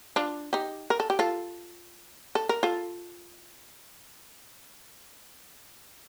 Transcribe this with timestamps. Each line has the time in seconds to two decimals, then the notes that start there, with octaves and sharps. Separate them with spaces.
0.16 D4 F4
0.53 D#4 G4
0.90 A#4
1.00 A4
1.10 G4
1.19 F4 A4
2.35 A4
2.49 A#4
2.63 F4 A4